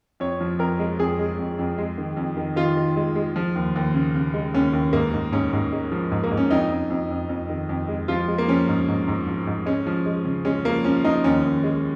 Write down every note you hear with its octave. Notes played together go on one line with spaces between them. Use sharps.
F2 C#5
F3
F2 A#4
G#3
F2 G#4
G#3
F2
F2
G#3
D#3
F2
D#3
D#3 F4
D#3
G#3
G#3
F3
D#2
D#2
C#3
C#3
G#3
D#2 C#4
D#2
G#2 A#3
G#2
G#2 C#4
G#2
G#3
F3
G#2
A#3
G#2
C#4
F2 D#4
F2
F2
F2
F2
D#3
F2
G#3
F3 F4
G#3
A#3
F3 C#4
G#2
G#2
G#2
F3
G#2
G#3 C#4
F3
G#3
C#3
G#3 C#4
F3 A#3
F3 C#4
F3 D#4
D#2 C#4
D#2
G#3